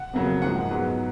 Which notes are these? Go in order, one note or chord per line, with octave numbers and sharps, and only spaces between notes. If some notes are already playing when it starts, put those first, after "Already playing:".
Already playing: F#5
F2 C#3 F#3 A#3
G#2 F3 G#3 F#5
G#2 F#3 B3